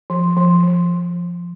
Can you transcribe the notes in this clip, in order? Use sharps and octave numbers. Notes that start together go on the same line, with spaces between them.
F3
F3
F3